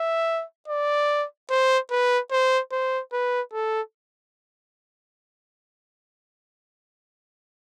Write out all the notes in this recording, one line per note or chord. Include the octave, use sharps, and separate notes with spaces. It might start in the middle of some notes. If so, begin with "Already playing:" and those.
Already playing: E5
D5
C5
B4
C5
C5
B4
A4